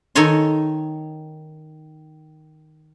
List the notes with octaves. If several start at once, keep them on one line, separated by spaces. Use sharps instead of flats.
D#3 D#4 A4 C#5 G#5 C6